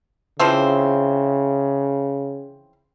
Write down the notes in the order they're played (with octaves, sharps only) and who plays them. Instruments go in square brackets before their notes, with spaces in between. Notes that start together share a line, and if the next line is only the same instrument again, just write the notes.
[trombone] C#3 [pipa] E3 F3 C4